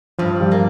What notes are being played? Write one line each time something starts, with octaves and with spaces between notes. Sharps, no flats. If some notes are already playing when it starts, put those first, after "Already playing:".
G2 F3
G3
A#3